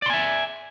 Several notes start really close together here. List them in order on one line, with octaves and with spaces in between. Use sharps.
D5 C6 G#5 E5